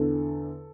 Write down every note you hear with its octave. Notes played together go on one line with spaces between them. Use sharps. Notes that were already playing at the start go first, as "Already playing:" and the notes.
Already playing: E2 D3 A4